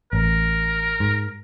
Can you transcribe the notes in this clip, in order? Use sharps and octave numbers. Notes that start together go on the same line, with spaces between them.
A1 A#4
G#2